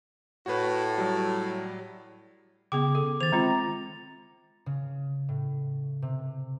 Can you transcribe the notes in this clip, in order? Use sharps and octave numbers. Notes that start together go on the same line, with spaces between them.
A2 F#4 B4
F#3 G3
C#3 B3 G#4 G5 D6
A4
D#3 C5 A6 F7
G#3 C4 F4 A#5
C#3
A2
C3